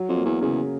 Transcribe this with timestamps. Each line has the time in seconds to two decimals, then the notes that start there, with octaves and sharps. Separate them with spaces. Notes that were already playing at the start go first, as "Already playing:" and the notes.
Already playing: F#3
0.09 F2
0.17 A#3
0.25 E2
0.41 E2 C#3